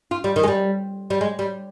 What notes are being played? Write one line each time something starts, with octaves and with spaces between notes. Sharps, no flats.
F4
G3
D#3
G#3
G3
G3
G#3
G3